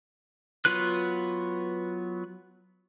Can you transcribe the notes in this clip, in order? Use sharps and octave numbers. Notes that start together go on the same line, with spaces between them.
F#3 B3 F4 B4 F#6